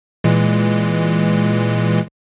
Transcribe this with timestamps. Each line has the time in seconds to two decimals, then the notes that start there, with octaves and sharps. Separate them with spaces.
0.24 A#2 E3 G#3